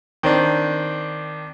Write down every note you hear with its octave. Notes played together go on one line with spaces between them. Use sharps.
D#3 C4 D4